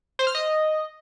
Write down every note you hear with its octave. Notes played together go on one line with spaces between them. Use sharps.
C5
F6
D#5